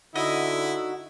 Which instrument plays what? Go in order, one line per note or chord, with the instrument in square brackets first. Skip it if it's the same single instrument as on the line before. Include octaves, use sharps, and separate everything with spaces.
[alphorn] D3 [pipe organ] D#4 F#4 [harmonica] E4 [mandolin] D#5